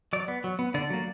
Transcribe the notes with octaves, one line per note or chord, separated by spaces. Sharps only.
F#3 D5
B3
F#3
B3
D3 D5
F#3 A#3